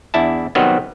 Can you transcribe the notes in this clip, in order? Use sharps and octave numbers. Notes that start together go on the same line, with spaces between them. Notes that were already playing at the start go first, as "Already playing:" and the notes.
E2 D4 E4 A5
C3 D#3 F#3 G3 B3 C4